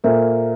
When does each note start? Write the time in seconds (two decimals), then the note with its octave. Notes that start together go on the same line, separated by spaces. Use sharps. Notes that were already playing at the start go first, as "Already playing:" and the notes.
0.04 A#2 A#3 A4 C5 E5 A#5